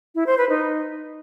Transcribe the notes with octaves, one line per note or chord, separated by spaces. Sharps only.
E4
C5
B4
D#4